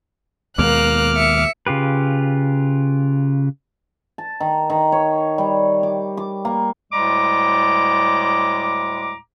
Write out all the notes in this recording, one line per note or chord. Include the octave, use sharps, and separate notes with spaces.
D#2 B2 G#3 A#3 D6 F6 F#6
E5 C#7
C#3 F4 G4 B4
A5
D#3
D#3
C#5
G3
D6
D6
A#3
D2 A2 G3 G#3 A#5 D6